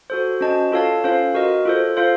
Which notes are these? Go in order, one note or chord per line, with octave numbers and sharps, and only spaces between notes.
F#4 A4 C5
C#4 F#4 C5 D#5 A5
F4 A4 C#5 F5 A5
C#4 F4 A4 C5 F5
F#4 A#4 D#5
F4 A4 C5
F4 A4 C5 F5